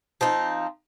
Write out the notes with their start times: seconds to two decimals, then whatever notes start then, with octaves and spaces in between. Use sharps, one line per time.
0.21 F3 C4 D#4